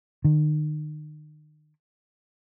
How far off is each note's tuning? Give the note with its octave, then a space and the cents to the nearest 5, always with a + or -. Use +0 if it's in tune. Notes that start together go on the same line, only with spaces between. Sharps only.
D#3 -40